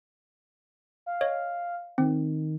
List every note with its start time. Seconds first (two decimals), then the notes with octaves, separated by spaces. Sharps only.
1.06 F5
1.21 C#5 D#5
1.98 D#3 C4